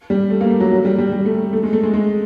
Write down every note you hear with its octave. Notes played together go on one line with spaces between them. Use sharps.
G3
A3
A#3
A3
F#3
F#3
G3
G3
G3
A3
A3
G#3
A3
G#3
G#3